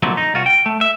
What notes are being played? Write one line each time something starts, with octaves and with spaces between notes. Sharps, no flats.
F2 A#2 D3 F#3 G3 A3
D#4
C2 F4 F#4
G5
A3
E5